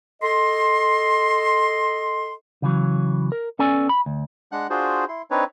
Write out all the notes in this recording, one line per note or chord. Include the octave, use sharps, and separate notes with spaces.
A4 D#5 C6
C#3 E3 F#3
A#4
B3 C#4 A4 D5 G#5
B5
D2
G#3 D4 F#5 F#6
D4 F4 F#4 G#4 C5
E4 C6
C4 D4 D#4 B4 C#5